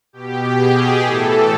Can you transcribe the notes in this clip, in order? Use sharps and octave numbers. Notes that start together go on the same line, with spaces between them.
B2 G4
G#4
A2 E3 A4